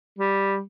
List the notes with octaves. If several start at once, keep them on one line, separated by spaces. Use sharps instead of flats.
G3